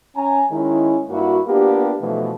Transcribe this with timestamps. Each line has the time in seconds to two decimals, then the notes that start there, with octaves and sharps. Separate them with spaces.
0.16 C#4 G#5 A#5
0.51 D#3 G#3 C#4 E4
1.09 G2 A#3 E4 F#4
1.46 A#3 B3 D4 F4 G4
2.00 B2 E3 F3 A3